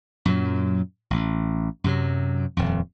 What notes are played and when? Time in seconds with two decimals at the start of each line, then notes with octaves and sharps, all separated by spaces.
0.25 F#2 A#2 F#3
1.10 A1
1.84 F#2 C3 F#3
2.57 D#1 F2